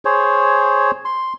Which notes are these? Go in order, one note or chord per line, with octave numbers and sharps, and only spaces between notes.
G#4 C5 C#5
C6